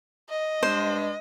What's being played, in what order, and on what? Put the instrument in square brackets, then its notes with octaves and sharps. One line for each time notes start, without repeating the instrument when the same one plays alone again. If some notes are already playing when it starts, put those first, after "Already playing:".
[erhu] D#5
[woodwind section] G2 G#3 D4 [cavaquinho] C5